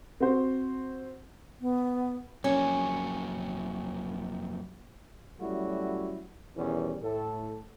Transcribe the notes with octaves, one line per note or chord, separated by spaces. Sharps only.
C4 F#4 C5
B3
F2 F#3 A#3 C#4
F#3 G3 A3 C#4 E4 F#4
E2 B2 D#3 E3 G3 C#4
A2 A4